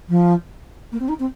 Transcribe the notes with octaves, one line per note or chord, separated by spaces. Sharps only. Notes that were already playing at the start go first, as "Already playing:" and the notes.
F3
A#3
C4
D#4
C4